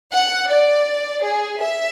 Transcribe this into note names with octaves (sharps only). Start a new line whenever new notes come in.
F#5
D5
G#4
E5